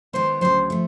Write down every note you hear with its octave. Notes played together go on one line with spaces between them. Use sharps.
D#3 G#3 B3 C5
D2 C#3 F#3 C5
F3 A3